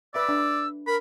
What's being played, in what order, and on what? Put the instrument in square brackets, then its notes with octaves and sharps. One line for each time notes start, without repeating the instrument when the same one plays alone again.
[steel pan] B4 E5 D6 [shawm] D5 [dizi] E6
[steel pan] D4
[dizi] A#4 [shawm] B5